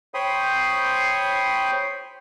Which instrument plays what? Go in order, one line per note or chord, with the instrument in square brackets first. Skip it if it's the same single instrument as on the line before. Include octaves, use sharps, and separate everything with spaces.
[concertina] C5 C#5 G5 B5 C6 D#6